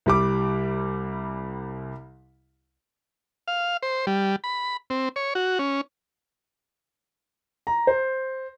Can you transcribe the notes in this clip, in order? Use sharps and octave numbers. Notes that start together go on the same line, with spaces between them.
C2 G3 D6
F5
C5
G3
B5
C4
C#5
F#4
C#4
A#5
C5